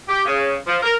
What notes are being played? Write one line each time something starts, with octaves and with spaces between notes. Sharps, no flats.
G4
C#3
F3
A#4